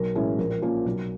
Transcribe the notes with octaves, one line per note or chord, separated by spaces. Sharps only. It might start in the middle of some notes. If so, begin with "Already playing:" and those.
Already playing: B1 A#4
A2 E3 G#3 C#4
A#1 A#4
A#4
A#2 F3 A#3 C#4 A#4
B1 A#4